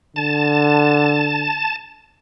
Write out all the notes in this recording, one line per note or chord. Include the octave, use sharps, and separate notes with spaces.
D3 A5